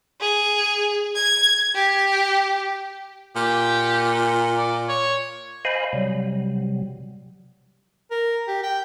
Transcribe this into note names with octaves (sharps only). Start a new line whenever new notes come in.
G#4
G#6
G4
A#2 G4
D5
C#5
C5 D#5 F5 G#5 B5
C3 F#3 G3
A#4
G4
G5